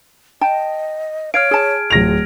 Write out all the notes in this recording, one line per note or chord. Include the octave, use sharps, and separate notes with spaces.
D#5 G5 A5
C#5 F5 F6 G#6 D7
G#4 A5
D1 F4 A#6 F7